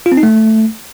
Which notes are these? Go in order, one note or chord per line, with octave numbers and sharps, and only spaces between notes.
F4
C4
D#4
A3